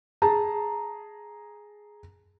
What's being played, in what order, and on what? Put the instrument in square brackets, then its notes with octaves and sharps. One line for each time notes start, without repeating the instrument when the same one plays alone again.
[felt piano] G#4 A5 A#5